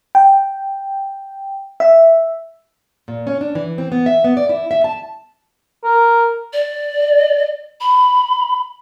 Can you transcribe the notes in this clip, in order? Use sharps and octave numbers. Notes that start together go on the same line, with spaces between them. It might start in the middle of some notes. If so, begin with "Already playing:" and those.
G5
E5
A#2
C#4
D4
E3
C4
B3
E5
B3
D5
E4
E5
A5
A#4
D5
B5